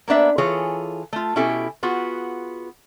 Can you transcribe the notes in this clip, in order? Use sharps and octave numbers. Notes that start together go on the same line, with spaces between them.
A#3 B3 D4 E5
E3 F4 G#4 A4 C#5
A3 F4
B2 C#4 E4 G4 A4 G#5
B3 F4 F#4 G#4